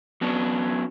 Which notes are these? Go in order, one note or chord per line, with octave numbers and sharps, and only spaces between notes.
F#3 B3 C#4 D4